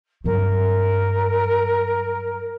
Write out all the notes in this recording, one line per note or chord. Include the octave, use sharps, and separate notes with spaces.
G2 F#3 A#4